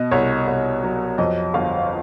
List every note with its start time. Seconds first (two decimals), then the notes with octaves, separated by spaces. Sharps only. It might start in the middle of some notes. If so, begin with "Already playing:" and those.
Already playing: B2 D#5
0.11 C2 C#5
0.47 C2
0.83 F#3
1.18 F2 D#5
1.54 G1 F5